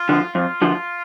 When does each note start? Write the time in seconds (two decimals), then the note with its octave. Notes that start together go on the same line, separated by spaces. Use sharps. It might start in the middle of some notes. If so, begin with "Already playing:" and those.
Already playing: F4
0.09 D3 F3
0.35 F2 F4
0.62 D3 F3